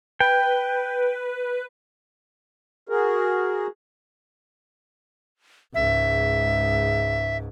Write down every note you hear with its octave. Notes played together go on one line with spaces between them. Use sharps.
B4 G5
F#4 G#4 A#4
C#2 G#2 E5